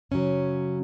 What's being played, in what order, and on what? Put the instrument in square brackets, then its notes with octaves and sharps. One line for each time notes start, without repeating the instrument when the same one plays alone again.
[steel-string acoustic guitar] F#2 C#3 F#3 C#4